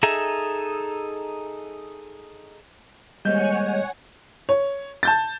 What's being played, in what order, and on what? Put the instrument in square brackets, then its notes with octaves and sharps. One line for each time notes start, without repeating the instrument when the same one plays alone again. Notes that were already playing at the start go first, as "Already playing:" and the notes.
[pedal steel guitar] D#4 G#4 A4 E5 A#5
[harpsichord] D#2 G#2 [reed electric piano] G3 G6 [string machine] C#5 F#5 G#5 [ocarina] D#5
[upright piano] C#5
A5 G6 A6